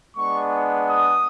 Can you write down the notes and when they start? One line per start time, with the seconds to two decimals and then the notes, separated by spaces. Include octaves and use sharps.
0.16 G#3 B3 D4 C#6
0.89 D#6